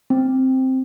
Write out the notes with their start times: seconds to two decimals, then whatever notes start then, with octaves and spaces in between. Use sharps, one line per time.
0.10 C4